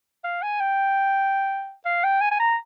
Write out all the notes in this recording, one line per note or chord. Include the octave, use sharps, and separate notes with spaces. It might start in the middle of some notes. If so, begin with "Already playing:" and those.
F5
G#5
G5
F5
G5
G#5
G#5
A#5